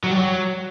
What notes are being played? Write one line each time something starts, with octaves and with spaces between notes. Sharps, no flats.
F#3
G3
F#3